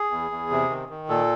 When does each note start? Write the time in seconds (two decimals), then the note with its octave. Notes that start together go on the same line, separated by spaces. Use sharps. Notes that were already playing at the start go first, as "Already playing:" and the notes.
Already playing: G#4
0.11 E2
0.31 E2
0.51 C3
0.70 D#3
0.89 D#3
1.09 A#2 A4